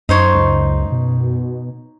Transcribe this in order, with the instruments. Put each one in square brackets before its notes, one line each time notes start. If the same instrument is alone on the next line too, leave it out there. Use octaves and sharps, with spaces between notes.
[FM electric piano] F#2 [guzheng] D#4 C5 C#5
[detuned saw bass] C#2
B2